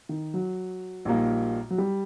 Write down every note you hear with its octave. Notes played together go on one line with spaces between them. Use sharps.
D#3
F#3
A#1 A#2 G3 A#3 D#4
F#3
G3